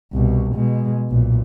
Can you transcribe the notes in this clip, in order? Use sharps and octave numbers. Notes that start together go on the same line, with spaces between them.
C2 B2
B2 G#3
B1 A#2